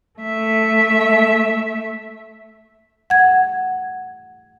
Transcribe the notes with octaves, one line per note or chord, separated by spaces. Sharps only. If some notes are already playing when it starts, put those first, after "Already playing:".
A3 E5
F#5 G#6